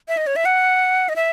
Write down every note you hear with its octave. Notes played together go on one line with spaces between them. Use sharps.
E5
D#5
C#5
E5
F#5
D#5
E5